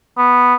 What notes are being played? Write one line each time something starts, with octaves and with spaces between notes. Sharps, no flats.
B3